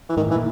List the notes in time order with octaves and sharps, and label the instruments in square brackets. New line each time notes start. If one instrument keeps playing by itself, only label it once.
[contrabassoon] E3
[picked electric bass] G#2 [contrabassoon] D#3
[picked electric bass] A2
[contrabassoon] E3
[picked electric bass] A#2